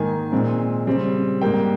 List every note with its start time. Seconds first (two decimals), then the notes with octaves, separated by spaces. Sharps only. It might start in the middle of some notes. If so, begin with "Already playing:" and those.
Already playing: G#2 D#3 A#3 G#5
0.32 A#2 G#3 C4
0.87 C#3 G3 C4
1.41 G#2 G3 A#3 G5